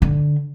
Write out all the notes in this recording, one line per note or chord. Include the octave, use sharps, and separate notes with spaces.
D3